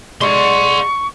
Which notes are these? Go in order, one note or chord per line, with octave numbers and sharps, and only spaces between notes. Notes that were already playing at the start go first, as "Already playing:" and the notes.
G#3 D5 F#5 C6 C#6